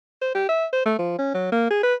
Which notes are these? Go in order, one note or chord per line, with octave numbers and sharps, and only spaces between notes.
C5
G4
E5
C5
A3
F3
C#4
F#3
A#3
G#4
B4